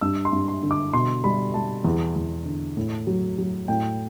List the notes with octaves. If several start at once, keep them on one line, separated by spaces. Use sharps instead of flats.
G2 E6
C6
G2
C6
D3
D6
B2 C6
G3 B5
G3 A5
E2
E2
D3
A2
F#3
F#3
A2 G5